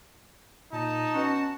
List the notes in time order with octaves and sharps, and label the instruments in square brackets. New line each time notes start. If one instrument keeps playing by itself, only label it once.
[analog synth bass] A#2 [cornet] D#4 [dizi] A5
[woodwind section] B2 F#4 [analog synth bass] C#4